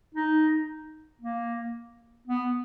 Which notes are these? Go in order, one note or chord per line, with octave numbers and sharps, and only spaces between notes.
D#4
A#3
B3